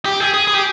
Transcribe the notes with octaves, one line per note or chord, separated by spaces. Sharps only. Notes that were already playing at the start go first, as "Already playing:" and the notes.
G4
G#4
G#4
G#4
G4